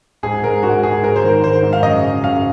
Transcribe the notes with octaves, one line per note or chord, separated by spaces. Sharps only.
G#2 G#4
G#2 A#4
G#2 F#4
G#2 G#4
G#2 A#4
C5
D#3 A#4
G#2 C5
G#2
F5
F#2 D#5
C#3
F#2 F5